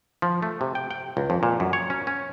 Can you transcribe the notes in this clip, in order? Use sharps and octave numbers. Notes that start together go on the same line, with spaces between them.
F3
A3
C3
G5
G5
C#2
F2
A#2
F#2
C#5
C#4
C#4